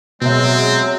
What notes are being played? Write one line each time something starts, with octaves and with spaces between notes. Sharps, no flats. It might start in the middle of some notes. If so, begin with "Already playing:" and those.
B2 F#3 G#3 C4 E5